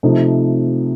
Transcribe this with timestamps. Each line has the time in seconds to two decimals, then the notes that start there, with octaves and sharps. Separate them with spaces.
0.03 C3 F3 A3 D#4